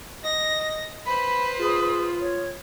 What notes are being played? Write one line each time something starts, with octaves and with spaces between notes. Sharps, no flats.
D#5 A#6
B4 C5 B5
F4 G#4
C#5